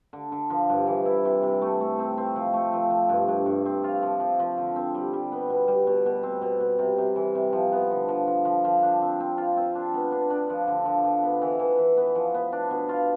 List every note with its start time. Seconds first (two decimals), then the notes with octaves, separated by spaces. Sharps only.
0.13 D3
0.32 D3
0.50 F3
0.70 G2
0.87 E3
1.05 E4
1.25 C3
1.43 C3
1.61 A3
1.80 A3
1.99 C4
2.18 C4
2.36 F3
2.53 A3
2.73 F3
2.90 F3
3.09 G2
3.28 G2
3.46 G2
3.65 C4
3.84 F4
4.02 F3
4.20 F3
4.39 F3
4.58 D3
4.76 C4
4.94 G3
5.13 G3
5.32 B3
5.50 B2
5.68 G3
5.87 B2
6.06 B2
6.23 C4
6.42 B2
6.60 B2
6.79 C3
6.98 C3
7.16 E3
7.35 C3
7.53 F3
7.72 B3
7.91 D3
8.08 F3
8.27 F3
8.45 F3
8.64 F3
8.82 D4
9.02 C4
9.20 C4
9.38 F4
9.57 C4
9.75 D4
9.94 B3
10.11 D4
10.30 D4
10.50 F3
10.67 D3
10.85 F3
11.04 F3
11.23 B3
11.42 E3
11.59 E3
11.79 E3
11.97 B3
12.15 F3
12.34 B3
12.52 D4
12.71 B2
12.89 F4